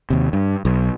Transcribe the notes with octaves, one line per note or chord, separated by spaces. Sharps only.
D#2 C3
G2
B1